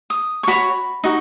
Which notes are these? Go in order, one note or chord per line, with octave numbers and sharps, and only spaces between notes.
D#6
C#6
F#4 C#5 B5
D#4 F#4